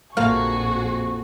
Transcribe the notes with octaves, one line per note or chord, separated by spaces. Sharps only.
A#1 F2 A#3 F#4 G#4 F5 C#6